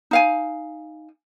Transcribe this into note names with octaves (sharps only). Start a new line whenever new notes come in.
D#4 F5 G#5